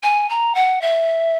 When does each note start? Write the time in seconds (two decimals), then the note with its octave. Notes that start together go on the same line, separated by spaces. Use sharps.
0.03 G#5
0.29 A#5
0.54 F#5
0.81 E5